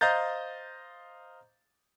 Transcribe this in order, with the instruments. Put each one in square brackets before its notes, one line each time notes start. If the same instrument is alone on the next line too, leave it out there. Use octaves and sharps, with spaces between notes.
[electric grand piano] C5 D#5 F5 A#5 G6 A6